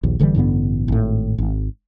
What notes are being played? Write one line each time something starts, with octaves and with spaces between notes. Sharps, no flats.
A#1 D#2
F#1 D3 E3 G3
A1 G2 D3 B3
G#1 A2
G#1